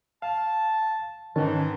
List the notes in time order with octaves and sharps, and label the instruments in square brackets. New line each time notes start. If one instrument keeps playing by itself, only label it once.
[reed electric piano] F5 [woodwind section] A5
[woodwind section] G#2 E3 [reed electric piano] D#3 C#4 A5